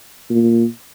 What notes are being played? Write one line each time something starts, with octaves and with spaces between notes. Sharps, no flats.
A#2